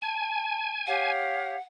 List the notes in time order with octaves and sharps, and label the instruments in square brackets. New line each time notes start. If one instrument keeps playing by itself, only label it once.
[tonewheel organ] G#5 [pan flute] A5
[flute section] G4 C#5 F5 [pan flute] F#5